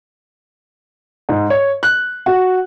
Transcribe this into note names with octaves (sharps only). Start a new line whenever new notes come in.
G#2
C#5
F#6
F#4